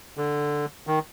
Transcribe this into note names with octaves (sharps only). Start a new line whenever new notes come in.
D3
D#3